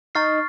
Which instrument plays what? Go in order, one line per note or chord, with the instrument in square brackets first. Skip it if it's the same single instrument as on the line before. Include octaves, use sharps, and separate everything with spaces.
[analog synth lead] D#4 [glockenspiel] C#6 F6 A6 C7